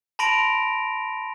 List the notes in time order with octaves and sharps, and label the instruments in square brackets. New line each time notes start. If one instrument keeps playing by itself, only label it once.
[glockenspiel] A5 B5 C6 A#6 D7 F7